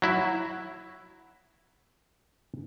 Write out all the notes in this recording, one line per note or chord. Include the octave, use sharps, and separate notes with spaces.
F#3 E4 E5